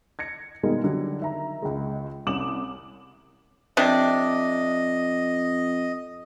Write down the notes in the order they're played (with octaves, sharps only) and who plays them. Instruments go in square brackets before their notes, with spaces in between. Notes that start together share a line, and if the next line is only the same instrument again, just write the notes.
[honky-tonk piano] G#6 A#6 C#7
B2 D#3 G3 G#3 A#3 D#4
D3 F#3 G3
D#3 E5 A#5
C#2 G#3
C2 C#4 D6 D#6 E7 F#7
[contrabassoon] F2 [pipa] C3 D4 [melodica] D#5